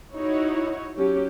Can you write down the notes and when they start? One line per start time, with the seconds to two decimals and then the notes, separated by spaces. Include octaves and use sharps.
0.15 D#4 E4 F#4 C#5
0.98 F#3 C#4 G4